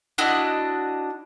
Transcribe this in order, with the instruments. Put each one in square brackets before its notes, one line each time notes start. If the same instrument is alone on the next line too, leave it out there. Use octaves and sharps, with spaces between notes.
[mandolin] D4 E4 F#4 D#5